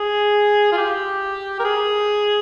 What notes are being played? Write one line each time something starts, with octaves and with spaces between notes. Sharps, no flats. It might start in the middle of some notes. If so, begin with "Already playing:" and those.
Already playing: G#4
F4
G4
A#4
G#4